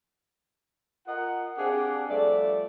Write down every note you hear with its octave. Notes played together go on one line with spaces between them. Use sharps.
F4 A#4 D#5 F#5
C4 D4 G4 G#4 F5 F#5
G2 F3 A3 D5